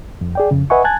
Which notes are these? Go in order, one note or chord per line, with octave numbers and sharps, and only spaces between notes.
F2
G#4 D5 G5
F2 C#3
B4 D#5 E5 F#5 G#5 C#6
G#5 A5 F#6 G#6 A6